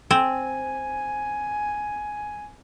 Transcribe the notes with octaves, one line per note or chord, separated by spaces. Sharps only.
C4 G#5